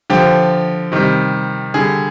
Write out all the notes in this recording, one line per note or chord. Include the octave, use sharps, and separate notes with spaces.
D3 F3 G4
C3 D#3 G3
D3 G3 G#4